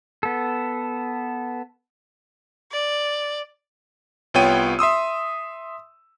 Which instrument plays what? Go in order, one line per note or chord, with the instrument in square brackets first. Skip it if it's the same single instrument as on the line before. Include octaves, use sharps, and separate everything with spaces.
[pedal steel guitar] B3 A4
[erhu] D5
[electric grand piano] C2 B3 F4 C#5 G5 D#7
E5 C6 D#6 E6